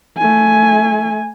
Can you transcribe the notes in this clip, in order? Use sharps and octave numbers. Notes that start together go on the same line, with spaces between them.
A3 G#5